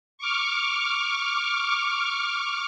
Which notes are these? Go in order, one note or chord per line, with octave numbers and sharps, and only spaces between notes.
C#6 D6 F6